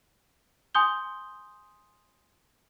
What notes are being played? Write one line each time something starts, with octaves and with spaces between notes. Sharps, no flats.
G#5 C6 D#6 G6 G7